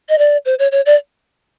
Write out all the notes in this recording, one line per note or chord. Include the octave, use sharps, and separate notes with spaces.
D#5
D5
C5
C#5
C#5
D5